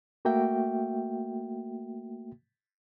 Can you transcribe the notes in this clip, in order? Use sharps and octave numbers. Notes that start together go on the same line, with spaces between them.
A3 A#3 F#4 E5 G5